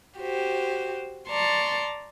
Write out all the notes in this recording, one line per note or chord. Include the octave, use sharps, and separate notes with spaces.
F#4 G4 C5
D5 A5 A#5 C6 C#6